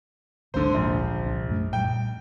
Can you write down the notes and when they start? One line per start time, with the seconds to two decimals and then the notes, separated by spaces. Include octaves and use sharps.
0.54 G#1 D2 D3 G#3 C5
0.74 A#1
1.25 C2 D4
1.50 F#2 A3
1.73 A#2 G3 G5